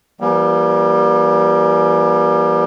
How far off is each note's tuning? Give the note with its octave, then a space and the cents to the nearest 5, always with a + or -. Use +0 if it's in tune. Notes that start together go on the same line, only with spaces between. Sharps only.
E3 +40 G3 -5 A#3 +40